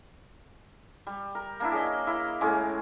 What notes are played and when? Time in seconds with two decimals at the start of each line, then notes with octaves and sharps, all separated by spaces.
1.07 G3
1.35 A#4
1.60 A#3 D4 E4
1.72 G#4 C#5 D#5
2.07 E4 A#4 D#5
2.40 A2 G#3 C#4 D6